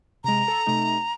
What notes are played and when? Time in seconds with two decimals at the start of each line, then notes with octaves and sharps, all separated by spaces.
0.24 C3 G#3 A#5
0.48 A4
0.66 C3 A3 D#4